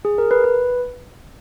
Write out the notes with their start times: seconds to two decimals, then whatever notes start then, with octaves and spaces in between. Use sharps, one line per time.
0.05 G#4
0.18 A#4
0.31 B4
0.44 B4